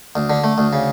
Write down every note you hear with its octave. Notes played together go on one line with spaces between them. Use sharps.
D2
D3
A3
D2
C#3